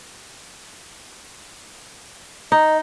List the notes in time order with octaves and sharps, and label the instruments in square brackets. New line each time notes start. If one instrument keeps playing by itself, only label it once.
[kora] D#4 [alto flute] D#5